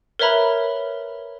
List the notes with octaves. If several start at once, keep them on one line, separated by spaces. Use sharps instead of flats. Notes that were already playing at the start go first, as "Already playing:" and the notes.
A#4 B4 C#5 E5 A#5 B5